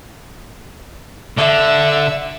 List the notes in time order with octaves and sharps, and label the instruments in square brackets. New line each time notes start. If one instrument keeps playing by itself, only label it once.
[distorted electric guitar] D3 [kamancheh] E5